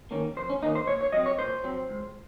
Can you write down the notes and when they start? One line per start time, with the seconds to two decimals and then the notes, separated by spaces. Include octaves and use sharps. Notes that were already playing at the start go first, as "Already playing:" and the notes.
0.11 D#3 A#3 C#4
0.37 F2 C5
0.50 C#4
0.62 D#3 A#3 C#4 D#4
0.75 C5
0.87 A#2 C#5
1.01 C#5
1.12 F#3 C4 D#5
1.26 C#5
1.39 A#2 C5
1.64 F#3 C4
1.89 C#2